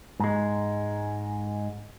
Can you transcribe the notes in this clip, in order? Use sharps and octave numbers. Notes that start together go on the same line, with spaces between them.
G#2 G#3